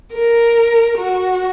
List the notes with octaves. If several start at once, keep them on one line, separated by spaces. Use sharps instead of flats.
A#4
F#4